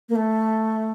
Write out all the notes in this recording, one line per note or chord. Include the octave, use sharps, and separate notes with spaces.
A#3
A3